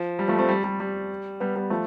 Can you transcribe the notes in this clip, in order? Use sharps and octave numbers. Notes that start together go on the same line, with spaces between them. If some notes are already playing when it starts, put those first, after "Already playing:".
Already playing: F3
G3
F3 A3
A3 C4
G3
G3
G3
G3 B3
G3 B3
F3 A3